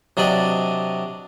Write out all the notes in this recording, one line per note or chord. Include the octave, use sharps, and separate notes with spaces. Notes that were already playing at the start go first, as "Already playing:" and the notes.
C3 F#3 D4 D5 D#5